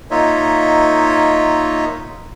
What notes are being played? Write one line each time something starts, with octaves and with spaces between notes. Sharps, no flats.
A#3 D#4 F4 C#5 D#5 E5